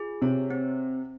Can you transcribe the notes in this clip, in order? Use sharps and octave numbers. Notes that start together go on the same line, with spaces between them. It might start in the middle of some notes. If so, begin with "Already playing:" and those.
Already playing: F4 G#4
C3 C#5
C4